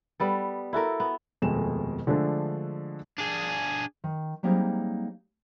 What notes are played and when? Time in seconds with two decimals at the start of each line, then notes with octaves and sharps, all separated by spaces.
0.20 G3 B3 A4
0.73 E4 F#4 A4 A#4
1.00 B3
1.42 D#1 F2 B2 G#3 A3 E7
2.07 D3 F3 G#3 A3 D4
3.18 D4 G#4
4.04 D#3
4.43 F#3 G3 A#3 C4 D#4 G#4